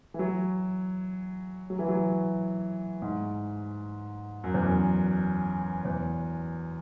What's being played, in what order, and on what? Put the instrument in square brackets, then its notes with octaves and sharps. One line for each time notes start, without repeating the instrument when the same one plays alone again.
[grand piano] E3
F#3
F#3
E3
F#3
G#2
F#2
E2
F#2
E2